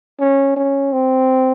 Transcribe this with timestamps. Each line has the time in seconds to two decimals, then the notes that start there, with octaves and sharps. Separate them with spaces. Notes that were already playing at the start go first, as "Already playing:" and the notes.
0.20 C#4
0.56 C#4
0.93 C4